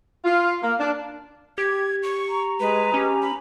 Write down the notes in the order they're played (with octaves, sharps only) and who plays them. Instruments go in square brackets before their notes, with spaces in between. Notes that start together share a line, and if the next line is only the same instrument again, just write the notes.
[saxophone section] F4
A#3
D4
[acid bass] G4 [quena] G#6
[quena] C#6
[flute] A#5
[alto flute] G#3 [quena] B4
[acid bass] C#4 [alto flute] G4
[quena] B5